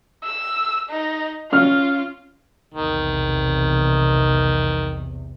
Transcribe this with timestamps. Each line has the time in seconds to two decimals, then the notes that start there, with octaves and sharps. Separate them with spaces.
0.24 E6
0.90 D#4
1.52 C#4 F4 F6
2.74 B1 E2 C3 D#3